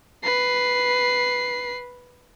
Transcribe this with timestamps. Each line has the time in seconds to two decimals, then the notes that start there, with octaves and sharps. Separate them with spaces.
0.24 B4 C7